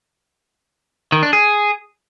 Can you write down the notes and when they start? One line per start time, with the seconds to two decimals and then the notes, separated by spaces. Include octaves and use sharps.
1.12 D#3
1.23 D4
1.33 G#4